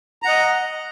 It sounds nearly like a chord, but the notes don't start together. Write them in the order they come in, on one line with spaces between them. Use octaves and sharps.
A#5 F#5 D#5